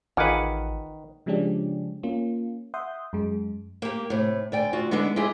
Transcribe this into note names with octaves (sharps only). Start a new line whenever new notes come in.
A1 D#3 F4 G#4 B4 F#5 G#5 D6
C#3 F3 G#3 C#4 D4 G4
A#3 C#4 F4
E5 F#5 C6 D#6 G6
F#2 G#3
A#3 G4
A2 C3
D2 D5 G5 G#5
D2 F4 F#4
D3 G#3 B3 D4 E4
G#3 E4 F4 G4 G#4